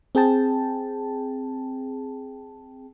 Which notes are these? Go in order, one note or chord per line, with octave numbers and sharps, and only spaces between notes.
C4 G#4 G5 A5